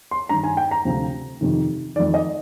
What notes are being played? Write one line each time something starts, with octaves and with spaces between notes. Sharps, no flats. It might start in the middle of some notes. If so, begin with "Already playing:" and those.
C6
G2 D#3 A#5
G#5
G5
A#5
D2 C3 F3
F2 C3 D#3
F2 D#3 D5
D#5